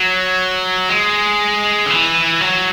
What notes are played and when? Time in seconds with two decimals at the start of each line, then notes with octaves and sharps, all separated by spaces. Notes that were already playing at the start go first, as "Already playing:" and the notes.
Already playing: F#3
0.89 G#3
1.85 D3
1.90 E3
2.41 F#3